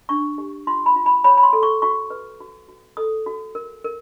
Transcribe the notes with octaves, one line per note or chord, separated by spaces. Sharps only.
D4 C#6
G4
F4 C6
B5
F4
B5
C#5 B5
B5
C6
A4
C#6
F#4 C#6
B4
F#4
F#4
A4 D#6
F#4
A#4
A#4